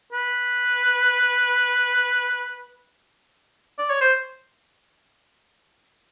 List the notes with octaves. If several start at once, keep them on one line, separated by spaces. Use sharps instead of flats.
B4
D5
C#5
C5